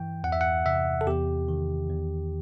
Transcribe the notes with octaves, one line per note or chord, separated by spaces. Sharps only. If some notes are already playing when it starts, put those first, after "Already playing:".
Already playing: G2 E3 G5
E2 F#5
E5
F#5
C3 E5
A4
E2 G4
D#3
E2